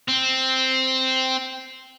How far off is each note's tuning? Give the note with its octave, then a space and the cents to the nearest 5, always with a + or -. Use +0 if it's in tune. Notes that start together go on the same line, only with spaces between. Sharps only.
C4 +0